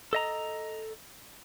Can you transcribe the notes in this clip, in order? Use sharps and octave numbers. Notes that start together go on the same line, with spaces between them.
A4 D#5 A#5